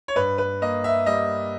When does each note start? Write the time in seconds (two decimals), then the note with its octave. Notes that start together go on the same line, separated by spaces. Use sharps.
0.08 C#5
0.16 G2 B4
0.38 B4
0.62 A#3 D#5
0.84 E5
1.06 G3 D#5